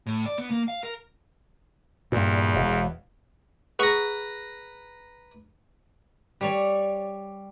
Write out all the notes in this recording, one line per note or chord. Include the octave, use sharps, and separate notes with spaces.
A2
D5
B3
A#3
F5
A#4
E2 G2 A#2
E1
G#4 B4 F#5 A#5 C#6
G3 C#5 D5